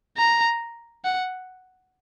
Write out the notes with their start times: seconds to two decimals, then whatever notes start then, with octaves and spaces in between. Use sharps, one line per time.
0.18 A#5
1.04 F#5